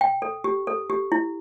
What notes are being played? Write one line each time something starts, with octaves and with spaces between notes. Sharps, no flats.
G5
A4
G4
A4
G4
E4